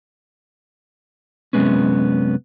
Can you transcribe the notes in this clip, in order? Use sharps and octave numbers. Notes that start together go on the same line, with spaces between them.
F#2 C3 F3 G#3 B3 C#4